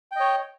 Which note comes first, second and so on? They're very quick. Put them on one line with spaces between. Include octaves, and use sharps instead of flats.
G5 D#5 C#5